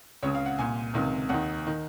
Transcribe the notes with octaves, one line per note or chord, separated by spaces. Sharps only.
C#2 C#3 C#5
F5
F#5
C2 A#2 G#5
C#2 C3 D#3
D#2 D#3 F#5
D#3